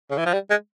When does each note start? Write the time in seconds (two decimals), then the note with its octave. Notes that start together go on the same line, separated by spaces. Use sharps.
0.11 C#3
0.18 E3
0.26 F3
0.33 G3
0.50 G#3